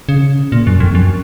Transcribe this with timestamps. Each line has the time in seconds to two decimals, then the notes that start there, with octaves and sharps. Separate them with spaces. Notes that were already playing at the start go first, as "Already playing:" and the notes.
0.09 C#3
0.52 A#2
0.67 F#2
0.80 F2
0.95 F#2